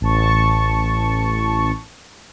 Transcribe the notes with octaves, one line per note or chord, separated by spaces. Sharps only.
A1 A5 C#6